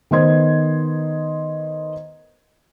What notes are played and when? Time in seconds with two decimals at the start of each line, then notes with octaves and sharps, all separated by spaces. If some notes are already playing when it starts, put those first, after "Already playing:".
0.11 D#3 B3 C5 D#5 C6 G#6